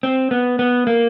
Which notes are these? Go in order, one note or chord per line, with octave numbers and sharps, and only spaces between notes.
C4
B3
B3
A#3